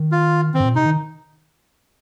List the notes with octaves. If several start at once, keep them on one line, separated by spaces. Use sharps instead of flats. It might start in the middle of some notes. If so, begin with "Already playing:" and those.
Already playing: D#3
F4
D#3 C4
G2
A#2
C3 D#4
D#3